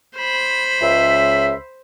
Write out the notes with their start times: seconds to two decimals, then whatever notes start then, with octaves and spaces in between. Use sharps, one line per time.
0.17 C5 B5
0.82 C#2 E5